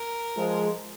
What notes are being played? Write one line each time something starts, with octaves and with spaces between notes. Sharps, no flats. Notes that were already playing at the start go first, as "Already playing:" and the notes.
Already playing: A#4
F3 G#3